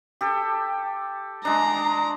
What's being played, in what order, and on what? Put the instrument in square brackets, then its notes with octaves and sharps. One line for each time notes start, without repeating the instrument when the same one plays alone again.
[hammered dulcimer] G4 A4
[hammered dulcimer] G#3 D4 [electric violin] A#5